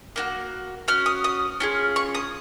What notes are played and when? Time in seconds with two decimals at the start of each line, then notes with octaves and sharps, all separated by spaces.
0.16 A#3 D#4 F#4
0.88 C#4 F#4 F6
1.06 D#6
1.24 D#6
1.60 C#4 F4 G#4
1.96 C#6
2.15 D#6